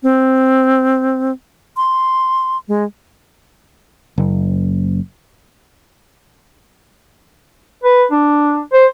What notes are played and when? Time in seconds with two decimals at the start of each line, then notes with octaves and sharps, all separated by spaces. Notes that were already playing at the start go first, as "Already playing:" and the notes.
0.03 C4
1.77 C6
2.68 G#3
4.18 F#1
7.84 B4
8.11 D4
8.73 C5